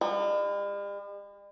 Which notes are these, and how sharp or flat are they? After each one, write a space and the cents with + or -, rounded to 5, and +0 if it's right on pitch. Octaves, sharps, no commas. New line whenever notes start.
G3 +45